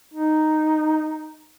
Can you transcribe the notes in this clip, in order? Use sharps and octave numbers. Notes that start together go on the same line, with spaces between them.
D#4